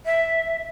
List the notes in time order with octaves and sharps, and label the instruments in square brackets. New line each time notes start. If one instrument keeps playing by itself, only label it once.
[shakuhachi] E5